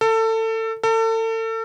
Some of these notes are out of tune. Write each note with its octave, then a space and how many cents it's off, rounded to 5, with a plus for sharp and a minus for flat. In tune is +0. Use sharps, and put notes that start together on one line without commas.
A4 +25
A4 +35